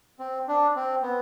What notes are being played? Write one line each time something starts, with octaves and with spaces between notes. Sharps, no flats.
C4
D4
C4
B3